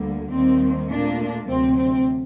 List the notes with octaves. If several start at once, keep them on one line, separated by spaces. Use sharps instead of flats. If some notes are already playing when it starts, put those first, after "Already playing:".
Already playing: D2 D3 G3 A#3
D#2 D#3 G3 A#3 C4
A#2 A3 A#3 D4
D2 C3 F#3 C4
C4